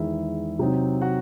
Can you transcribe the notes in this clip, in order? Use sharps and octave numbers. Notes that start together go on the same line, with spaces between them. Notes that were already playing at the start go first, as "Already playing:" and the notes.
Already playing: E2 D#3 G#3 E4 E5
C3 F#3 C4 D#4
F#4 F#5